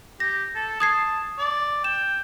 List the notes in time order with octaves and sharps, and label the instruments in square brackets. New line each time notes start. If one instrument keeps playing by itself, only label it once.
[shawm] G4 [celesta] A#6
[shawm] A4
[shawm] A5 [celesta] D#6 G#6 C7
[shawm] D5
[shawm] G5 [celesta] E7